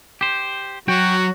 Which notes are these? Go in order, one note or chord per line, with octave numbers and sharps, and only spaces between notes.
G4 C5
F#3 F#4 G5